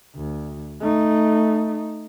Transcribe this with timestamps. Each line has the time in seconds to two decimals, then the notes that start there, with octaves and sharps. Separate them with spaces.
0.16 D2
0.80 A3 D#4